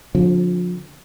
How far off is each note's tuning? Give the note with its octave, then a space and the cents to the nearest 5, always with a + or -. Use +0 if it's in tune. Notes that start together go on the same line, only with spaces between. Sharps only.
D3 -10 F3 +35 C4 +0